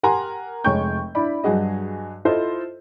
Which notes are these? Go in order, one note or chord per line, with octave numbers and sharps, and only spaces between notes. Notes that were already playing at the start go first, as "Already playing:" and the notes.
G4 A#4 F#5 G#5 A#5 C6
F1 G#3 C#5 G5 C#6 G6
D4 E4 D5 B5
G2 F#3 F#4 G#4 D#5
E4 F4 A4 C5 D#5